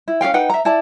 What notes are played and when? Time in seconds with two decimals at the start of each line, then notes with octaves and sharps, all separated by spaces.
0.08 E4
0.21 C#4 G#4 F5 G5
0.34 D#4 B4 F#5 G5
0.50 E5 A#5
0.65 E4 D5 A5